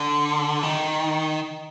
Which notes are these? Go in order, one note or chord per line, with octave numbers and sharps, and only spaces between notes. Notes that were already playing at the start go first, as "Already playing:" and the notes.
Already playing: D3
D#3